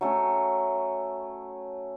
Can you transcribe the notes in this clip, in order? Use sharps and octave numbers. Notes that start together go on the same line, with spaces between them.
F#3 A3 C#4